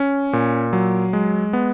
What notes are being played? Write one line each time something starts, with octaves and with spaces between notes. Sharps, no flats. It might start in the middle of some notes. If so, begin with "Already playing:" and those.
Already playing: C#4
A#2
F#3
G#3
B3